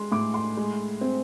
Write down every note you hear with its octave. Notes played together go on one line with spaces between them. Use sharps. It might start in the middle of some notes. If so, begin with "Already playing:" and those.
Already playing: G#3 C6
A2 D6
C6
G#3
C4